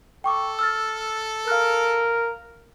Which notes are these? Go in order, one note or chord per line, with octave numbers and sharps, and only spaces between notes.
A4 G5 C#6 D6
E6 F6 A6
A#4 F5 F6 F#6